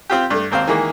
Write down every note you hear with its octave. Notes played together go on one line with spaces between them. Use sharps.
C4 F4 G4
G2 A3
G#1 D#2 C4 C5 F5
D#3 E3 G#3 A#3